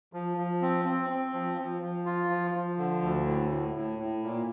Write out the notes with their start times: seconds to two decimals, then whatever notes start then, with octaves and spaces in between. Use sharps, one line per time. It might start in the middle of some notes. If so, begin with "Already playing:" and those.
0.13 F3
0.37 F3
0.62 C4
0.85 C4
1.10 C4
1.34 F3
1.58 F3
1.82 F3
2.06 F4
2.30 F3
2.54 F3
2.78 D3
3.02 D2
3.26 A2
3.50 A2
3.75 A2
3.98 A2
4.23 A#2